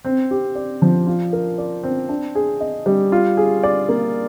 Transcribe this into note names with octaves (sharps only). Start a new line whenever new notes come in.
C4
G4
D5
F3
F4
A#4
D5
C4
D4
G#4
D#5
G3
F4
G#4
D5
A#3